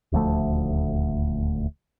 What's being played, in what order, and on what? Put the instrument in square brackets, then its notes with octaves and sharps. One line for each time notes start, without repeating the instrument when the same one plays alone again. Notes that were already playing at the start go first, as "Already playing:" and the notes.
[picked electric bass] D#1 D2 F3 A3